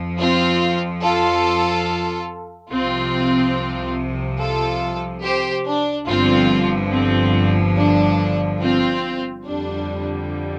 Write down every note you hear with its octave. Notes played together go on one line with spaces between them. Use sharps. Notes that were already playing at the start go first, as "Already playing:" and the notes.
Already playing: F2 F3
C4 F4
F4 A4
C2 C3 F3 C4 F4
F4 A4
G4 C5
D4
G1 G2 D3 F3 C4 F4
C4
D4
C4 F4
F2 D3 G3 D4